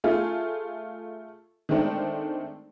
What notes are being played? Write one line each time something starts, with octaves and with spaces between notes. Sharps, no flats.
A3 F4 G#4
D#3 G#3 A3 C4 D4